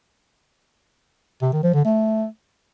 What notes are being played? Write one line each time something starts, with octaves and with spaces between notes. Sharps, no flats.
C3
D#3
F3
D3
A3